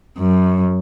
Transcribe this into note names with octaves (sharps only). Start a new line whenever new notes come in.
F#2